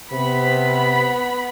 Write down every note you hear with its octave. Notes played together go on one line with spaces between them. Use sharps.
C3 B3 B5